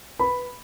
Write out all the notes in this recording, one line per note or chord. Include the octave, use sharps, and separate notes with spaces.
B4 B5